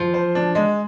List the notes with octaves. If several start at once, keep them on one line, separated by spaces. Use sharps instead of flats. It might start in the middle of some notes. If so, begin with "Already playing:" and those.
Already playing: F3
C5
D4
G#3